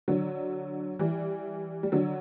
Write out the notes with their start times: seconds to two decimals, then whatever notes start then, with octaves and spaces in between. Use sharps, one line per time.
0.08 D3 F#3
0.99 E3 G3
1.83 G3
1.92 D3 F#3